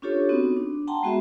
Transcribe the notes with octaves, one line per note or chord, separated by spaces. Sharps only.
C#4 D4 F4 G4 A4 C#5
B3 C4 D#4 F#4
D4
F#5 G5 A5 A#5 C6
G#3 B3 F#4 G#4 E5